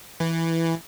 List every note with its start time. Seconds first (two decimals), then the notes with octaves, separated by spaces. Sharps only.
0.20 E3